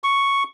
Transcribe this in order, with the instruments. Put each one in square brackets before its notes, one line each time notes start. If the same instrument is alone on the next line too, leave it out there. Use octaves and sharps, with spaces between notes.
[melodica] C#6